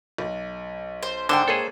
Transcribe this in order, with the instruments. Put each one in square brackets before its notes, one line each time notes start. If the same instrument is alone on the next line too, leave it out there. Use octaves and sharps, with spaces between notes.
[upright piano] B1
[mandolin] C5
[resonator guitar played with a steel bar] G#2 D4 G5 [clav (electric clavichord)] D3 [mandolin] C5
[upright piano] A#3 C#5 [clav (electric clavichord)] G#4 A4